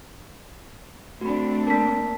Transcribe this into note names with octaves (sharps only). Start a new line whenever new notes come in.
A3 C4 D4 F#4 B5
A#3 A#4 A5 B6